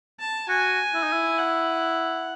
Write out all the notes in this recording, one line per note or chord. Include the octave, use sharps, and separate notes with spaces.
A5
F#4 G#5
E4
D#4
E4
F#5